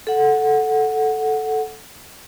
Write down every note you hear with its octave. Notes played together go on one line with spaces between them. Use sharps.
A4 F#5